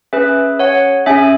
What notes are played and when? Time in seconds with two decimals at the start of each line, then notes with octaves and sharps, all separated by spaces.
0.13 C#4 G#4 B4 E5
0.59 C#5 F#5
1.06 C#4 G#4 E5 G#5